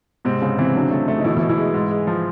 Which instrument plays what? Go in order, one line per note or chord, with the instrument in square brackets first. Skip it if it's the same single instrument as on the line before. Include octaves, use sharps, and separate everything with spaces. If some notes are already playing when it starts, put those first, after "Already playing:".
[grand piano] G#2 [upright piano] C3 C4
[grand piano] G#2 [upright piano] C#3 C#4
[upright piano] C3 C4 [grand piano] E3
[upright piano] D3 D4 [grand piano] F#3
[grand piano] A3
A3
[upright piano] D#4
[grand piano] B2 [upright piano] E3 E4
[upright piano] E3 E4
[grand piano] B2
[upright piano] E3 E4
[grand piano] G#3
G#2
G#3
F3